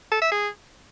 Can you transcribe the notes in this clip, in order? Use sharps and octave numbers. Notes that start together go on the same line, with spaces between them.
A4
E5
G#4